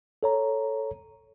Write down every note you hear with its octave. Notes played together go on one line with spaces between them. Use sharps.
A4 C#5 A#5